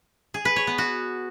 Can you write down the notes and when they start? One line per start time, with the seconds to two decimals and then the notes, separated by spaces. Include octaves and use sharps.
0.34 G#4
0.45 B4
0.56 C#5
0.67 B3
0.78 F#4